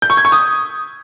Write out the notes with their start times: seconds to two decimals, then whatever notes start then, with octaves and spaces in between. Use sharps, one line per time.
0.02 G6
0.10 C#6
0.17 G#6
0.25 C#6
0.32 D#6